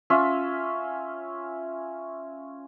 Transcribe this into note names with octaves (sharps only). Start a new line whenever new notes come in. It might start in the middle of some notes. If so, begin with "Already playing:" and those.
C#4 F4 E5